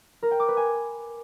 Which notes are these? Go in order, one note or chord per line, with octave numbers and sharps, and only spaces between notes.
A#4
G5
D6
B4
G#5